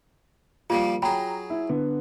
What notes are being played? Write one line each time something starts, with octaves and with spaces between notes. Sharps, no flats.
F3 G3 A#3 F4
F#3 G#4 G5 A#5 B5
E4
D3 B3